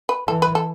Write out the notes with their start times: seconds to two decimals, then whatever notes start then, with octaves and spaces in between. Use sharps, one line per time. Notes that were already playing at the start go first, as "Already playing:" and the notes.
0.09 B4
0.28 E3 A4
0.42 B4
0.55 A4